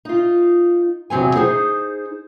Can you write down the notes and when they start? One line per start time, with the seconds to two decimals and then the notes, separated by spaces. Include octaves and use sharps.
0.05 D#4 F4
1.10 E2 C3 F#3 C4 G#5
1.35 D#4 G#4 C5